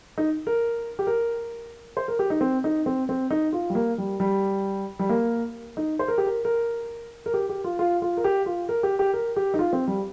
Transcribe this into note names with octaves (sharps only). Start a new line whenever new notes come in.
D#4
A#4
G4
A#4
C5
A#4
G4
D#4
C4
D#4
C4
C4
D#4
F4
G3
A#3
G3
G3
G3
A#3
D#4
C5
A#4
G4
A#4
A#4
A#4
G4
G4
F4
F4
F4
A#4
G4
F4
A#4
G4
G4
A#4
G4
D#4
F4
C4
G3